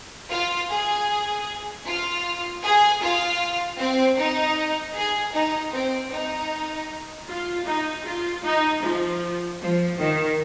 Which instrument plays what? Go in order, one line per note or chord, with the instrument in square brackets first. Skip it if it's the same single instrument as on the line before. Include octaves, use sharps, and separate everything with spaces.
[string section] F4
G#4
F4
G#4
F4
C4
D#4
G#4
D#4
C4
D#4
F4
D#4
F4
D#4
F3
F3
D#3